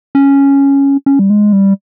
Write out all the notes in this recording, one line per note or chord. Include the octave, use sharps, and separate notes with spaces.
C#4
C#4
G3
G#3
G3